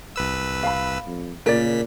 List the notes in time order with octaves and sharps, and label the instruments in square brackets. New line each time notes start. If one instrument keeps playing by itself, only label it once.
[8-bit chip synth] C2 B4 E6
[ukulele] F5 B5
[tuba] F2
[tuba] A#2 [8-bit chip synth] C#3 B6 [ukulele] A#4 D5